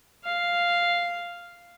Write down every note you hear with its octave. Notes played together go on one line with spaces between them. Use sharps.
F5